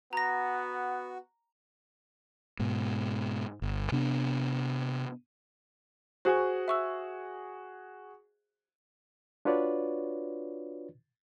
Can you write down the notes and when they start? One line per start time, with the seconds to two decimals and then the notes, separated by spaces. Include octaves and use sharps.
0.13 B3 F#4 A#5 A#6
2.59 G#2 B2
3.62 G1
3.92 C3 B3 D4
6.25 F#4 G#4 C5 C#6
6.68 E5 C#6 E6
9.45 D4 F4 F#4 B4 C#5 D5